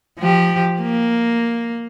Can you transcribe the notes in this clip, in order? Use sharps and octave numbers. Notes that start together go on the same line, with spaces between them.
F3 G4
A#3